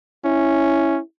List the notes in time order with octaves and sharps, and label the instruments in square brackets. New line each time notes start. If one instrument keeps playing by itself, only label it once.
[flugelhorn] C#4 [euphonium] E4